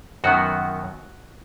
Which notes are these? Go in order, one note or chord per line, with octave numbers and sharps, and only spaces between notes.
F#2 D#3 F#3 B3 F#4